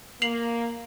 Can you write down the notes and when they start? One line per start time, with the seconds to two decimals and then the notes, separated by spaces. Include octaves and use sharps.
0.22 A#3 C7 F7 F#7